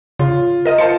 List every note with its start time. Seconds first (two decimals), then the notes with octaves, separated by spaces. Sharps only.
0.19 C#3 F4
0.65 A#4 D#5
0.78 F4 C5 A5 C#7